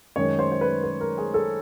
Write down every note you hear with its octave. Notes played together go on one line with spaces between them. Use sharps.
F#2 D#3 G#3 C#5
C5
C5
B4
B4
A#4
G#4
A4